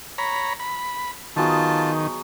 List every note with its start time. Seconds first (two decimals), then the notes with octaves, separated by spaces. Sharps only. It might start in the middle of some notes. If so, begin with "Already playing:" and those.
0.18 C#5 A#5 B5
0.60 B5
1.36 D#3 F#3 B3 F4 G#4 A5